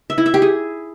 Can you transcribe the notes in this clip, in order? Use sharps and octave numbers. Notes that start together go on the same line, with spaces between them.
E5
E4
E5
G4
G#4